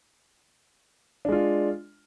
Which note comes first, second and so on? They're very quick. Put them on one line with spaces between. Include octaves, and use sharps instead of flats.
D4 G#3 F4